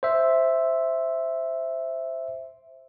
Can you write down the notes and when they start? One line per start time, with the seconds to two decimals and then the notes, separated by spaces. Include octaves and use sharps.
0.03 C5 E5